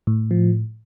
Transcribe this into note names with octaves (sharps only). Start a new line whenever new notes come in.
A2
F3